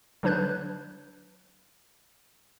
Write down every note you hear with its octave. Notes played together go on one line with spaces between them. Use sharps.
D3 F#3 D4 B4 F#6 G6